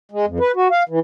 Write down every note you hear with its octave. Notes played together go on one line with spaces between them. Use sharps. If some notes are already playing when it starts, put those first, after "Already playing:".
G#3
F2
B4
F#4
F5
E3